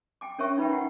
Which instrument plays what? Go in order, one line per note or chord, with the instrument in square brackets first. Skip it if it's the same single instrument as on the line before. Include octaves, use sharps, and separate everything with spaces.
[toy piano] G5 G#5 D6
C#4 A#4 C#5 E5 C#6
D#4 F4 B4 E5 G5
E4 F#5 G5